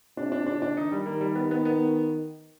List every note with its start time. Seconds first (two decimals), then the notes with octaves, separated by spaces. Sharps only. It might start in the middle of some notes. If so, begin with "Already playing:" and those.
0.17 C3 D4
0.32 D4
0.47 C#3 D4
0.62 D4
0.76 D#3 D#4
0.92 G3
1.06 D#3 A#3
1.21 G3
1.35 B3
1.51 B3
1.65 B3